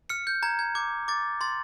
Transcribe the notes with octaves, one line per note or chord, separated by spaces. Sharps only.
F6 C#7
G6
A#5 G#6
G#6
D6 G#6
D6 A6
C6 A6